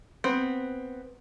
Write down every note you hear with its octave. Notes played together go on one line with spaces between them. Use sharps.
B3 C4